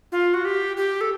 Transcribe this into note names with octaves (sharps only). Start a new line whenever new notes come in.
F4
F#4
G4
G4
A4